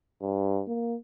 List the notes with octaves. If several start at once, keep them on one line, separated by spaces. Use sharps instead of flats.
G2
A#3